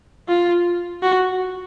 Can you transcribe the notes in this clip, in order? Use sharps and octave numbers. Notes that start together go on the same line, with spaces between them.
F4
F#4